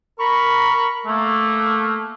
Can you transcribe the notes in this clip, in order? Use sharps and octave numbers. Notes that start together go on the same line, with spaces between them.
A#4 B5 C#6
A3 A#3